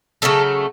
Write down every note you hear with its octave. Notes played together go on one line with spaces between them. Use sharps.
C#3 F#3 A3 A4